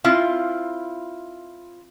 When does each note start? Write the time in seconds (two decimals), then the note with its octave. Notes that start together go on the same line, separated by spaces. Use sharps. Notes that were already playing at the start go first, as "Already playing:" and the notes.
0.04 C4 E4 F4